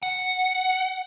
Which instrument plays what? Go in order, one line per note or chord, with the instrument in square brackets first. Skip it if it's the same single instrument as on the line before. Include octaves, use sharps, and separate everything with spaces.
[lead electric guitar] F#5